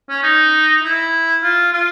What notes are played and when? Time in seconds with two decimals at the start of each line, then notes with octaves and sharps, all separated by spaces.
0.09 C#4
0.23 D#4
0.82 E4
1.43 F4
1.73 F4